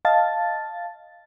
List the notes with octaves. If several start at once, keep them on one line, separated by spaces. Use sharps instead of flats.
D#5 F5 A5 A6